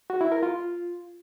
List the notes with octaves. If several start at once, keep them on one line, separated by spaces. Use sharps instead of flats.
F#4
E4
A#4
F4